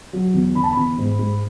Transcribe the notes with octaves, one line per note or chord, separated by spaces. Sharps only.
F#3
E2
E2 B5
A5
B5
E2
G#2
G#2